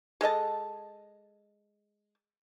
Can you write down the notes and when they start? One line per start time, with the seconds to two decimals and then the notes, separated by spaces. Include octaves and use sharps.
0.21 G#3 A4 D#5 A5